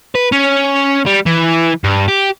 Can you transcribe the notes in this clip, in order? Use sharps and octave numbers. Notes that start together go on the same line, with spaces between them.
B4
C#4
G3
E3
G2
G4